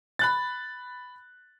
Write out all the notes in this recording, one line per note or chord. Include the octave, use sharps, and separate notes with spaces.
B5 F#6 A6